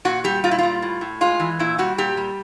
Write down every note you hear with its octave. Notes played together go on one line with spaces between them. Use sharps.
A#2 F#4
G3 G4
A#2 F4
E4
G3 F4
A2
A2
G#3 F4
E3
A#2 E4
G3 F#4
A#2 G4
G3